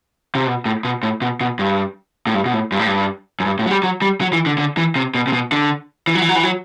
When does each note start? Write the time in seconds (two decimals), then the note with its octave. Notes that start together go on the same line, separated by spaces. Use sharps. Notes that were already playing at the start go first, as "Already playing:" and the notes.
0.35 C3
0.47 B2
0.65 A2
0.84 B2
1.03 A2
1.21 B2
1.41 B2
1.59 G2
2.27 A2
2.34 G2
2.45 B2
2.53 A2
2.72 G2
2.79 A2
2.87 G2
3.40 F#2
3.46 G2
3.59 A2
3.66 F#3
3.71 G3
3.83 F#3
4.02 G3
4.21 F#3
4.33 E3
4.46 D3
4.58 D3
4.77 E3
4.96 C3
5.15 B2
5.27 C3
5.33 B2
5.52 D3
6.07 E3
6.15 F#3
6.22 E3
6.29 F#3
6.36 E3
6.43 F#3